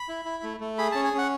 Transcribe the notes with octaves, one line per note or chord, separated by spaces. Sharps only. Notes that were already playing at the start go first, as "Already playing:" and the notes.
Already playing: B5
E4
E4
A3
A3
G#4 B5
C#4 A5
G#5
C#4
F#5